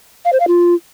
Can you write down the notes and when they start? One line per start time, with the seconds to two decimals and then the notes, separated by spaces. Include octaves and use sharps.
0.25 F5
0.33 C5
0.40 F5
0.48 F4